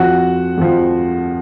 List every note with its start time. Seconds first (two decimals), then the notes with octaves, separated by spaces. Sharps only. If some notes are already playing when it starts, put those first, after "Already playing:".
Already playing: F2 F3 F#4 F#5
0.58 F2 F3